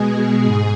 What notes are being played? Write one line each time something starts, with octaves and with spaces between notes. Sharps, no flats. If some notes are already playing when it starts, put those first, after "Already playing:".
Already playing: B2 G#3 G#4
G#2 G#4